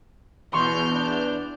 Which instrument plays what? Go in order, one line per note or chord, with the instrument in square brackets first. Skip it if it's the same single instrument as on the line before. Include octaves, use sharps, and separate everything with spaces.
[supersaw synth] E2 [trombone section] B2 [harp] C6 C#6 [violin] F6 G6
[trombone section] B3 D4